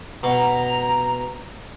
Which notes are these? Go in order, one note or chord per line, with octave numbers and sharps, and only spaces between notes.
B2 A#5